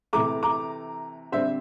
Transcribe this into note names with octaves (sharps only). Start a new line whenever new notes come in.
C3 E3 A3 A#5 D6
A#5 D6
D3 G3 C4 C5 E5